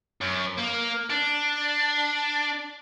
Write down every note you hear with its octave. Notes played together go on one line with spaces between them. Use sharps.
F#2
A#3
D4